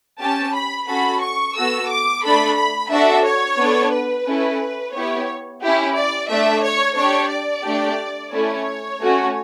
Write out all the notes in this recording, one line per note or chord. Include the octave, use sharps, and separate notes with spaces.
C#4 G4 A5
B5
C#4 F#4 A4 B5
C#6
B3 F#4 A4 E6
D6
A3 D4 A4 B5
B5
D4 F#4 A4 E5
C#5
B3 D4 A4
B4
C#4 E4 A4
B3 E4 G4 C#5
C#4 E4 G4
D5
A3 D4 A4 E5
C#5
D4 G4 C#5
D5
A3 D4 G4
A3 C#4 E4 A4 C#5
A3 C#4 F#4